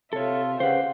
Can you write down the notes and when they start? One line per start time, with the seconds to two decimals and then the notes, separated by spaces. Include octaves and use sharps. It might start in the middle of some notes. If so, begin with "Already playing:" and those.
0.13 C3 F4 A4 C#5 E5
0.60 C#3 G4 B4 C5 F5 F#5